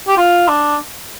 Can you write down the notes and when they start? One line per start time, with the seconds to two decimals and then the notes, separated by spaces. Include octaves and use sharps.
0.08 G4
0.17 F4
0.48 D4